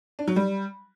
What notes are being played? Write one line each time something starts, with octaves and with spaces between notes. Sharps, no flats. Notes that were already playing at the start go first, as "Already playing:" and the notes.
D4
F#3
G3